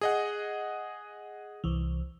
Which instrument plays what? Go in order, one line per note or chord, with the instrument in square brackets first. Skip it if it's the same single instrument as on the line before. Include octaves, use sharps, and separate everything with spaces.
[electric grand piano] G#4 D#5 F#5
[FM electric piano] C2 E3